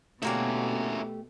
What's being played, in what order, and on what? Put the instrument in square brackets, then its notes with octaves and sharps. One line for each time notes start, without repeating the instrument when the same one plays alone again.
[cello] B2 [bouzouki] D3 A#3 C#4 [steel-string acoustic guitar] A3 G4 [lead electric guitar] E4 F#4